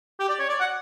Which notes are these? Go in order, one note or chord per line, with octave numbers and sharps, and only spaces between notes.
G4
D5
C#5
D5
F#5